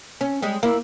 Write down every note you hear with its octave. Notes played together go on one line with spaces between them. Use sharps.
C#4
G3 G#3
A#3 E4